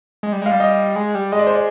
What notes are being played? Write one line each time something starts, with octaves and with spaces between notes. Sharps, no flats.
G#3
G3
G#3 F5
G3
D#5
G#3
G3
G#3 D#5
D5
C5
D5